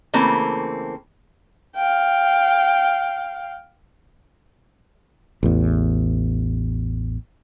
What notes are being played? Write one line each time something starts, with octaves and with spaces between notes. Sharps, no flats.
C#3 E3 A3 A#3 C4
F5 G5
A1 E2